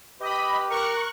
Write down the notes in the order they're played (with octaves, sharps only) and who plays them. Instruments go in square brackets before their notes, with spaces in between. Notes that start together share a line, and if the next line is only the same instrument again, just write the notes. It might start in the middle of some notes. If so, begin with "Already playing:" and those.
[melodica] G4 [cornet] B4 [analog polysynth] D#5 B5
[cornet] A#4 [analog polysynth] C#6 F#6